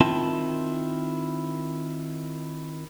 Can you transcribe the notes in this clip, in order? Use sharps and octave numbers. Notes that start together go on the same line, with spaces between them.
D#3 C4 E4 F4 A5